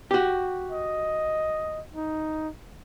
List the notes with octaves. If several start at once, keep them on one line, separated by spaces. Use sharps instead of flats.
F#4 G4
D#5
D#4